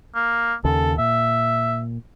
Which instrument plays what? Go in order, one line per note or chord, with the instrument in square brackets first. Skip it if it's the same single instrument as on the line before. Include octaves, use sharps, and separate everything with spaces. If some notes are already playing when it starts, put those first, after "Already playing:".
[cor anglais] A#3
[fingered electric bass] D#2 C#3 [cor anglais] A4
[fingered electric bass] A#2 [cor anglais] E5